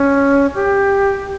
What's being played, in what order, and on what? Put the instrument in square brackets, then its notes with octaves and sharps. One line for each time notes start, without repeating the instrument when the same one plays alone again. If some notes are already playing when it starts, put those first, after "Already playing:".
Already playing: [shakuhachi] C#4
G4